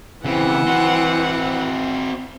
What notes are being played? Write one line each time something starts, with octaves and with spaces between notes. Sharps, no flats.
C#3 E3 C4 F#5
C4 F#4